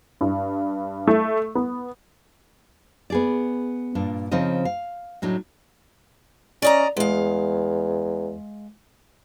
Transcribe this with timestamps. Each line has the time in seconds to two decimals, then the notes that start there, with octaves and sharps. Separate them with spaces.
0.21 G2
1.07 A3
1.55 B3
3.10 B3 G#4 D5
3.95 G2 A#2 D4
4.31 C#3 F3 C4 D#4 D#5
4.65 F5
5.22 A2 F#3 D4 D#4
6.62 C#4 D5 D#5 A#5
6.97 E2 G#3 F5